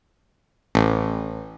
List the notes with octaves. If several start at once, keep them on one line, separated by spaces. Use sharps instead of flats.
A1